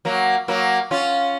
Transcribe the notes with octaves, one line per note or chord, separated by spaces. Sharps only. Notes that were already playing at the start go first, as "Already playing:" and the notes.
F#3 A#3
F#3 A#3
C#4 F4